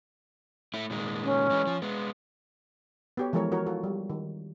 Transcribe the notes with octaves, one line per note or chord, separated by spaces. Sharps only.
A3 E4
A#2 D#3 G#3
C#4
E3 G#3
F3
G#3 B3
B3 F#4 G4 A4 C#5
E3 F3 G#3 A4 A#4 C#5
E4 F#4 A#4 C#5
F4 F#4 A4
G3
D#3